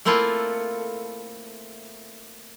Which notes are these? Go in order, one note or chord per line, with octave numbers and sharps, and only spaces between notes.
A3 A#3 C4 E4 F4 A4